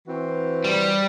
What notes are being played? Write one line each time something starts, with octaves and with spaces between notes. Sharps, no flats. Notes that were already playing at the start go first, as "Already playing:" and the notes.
E3 C4 F#4
G3